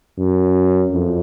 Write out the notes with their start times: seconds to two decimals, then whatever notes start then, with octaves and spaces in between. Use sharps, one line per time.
0.18 F#2
0.91 F2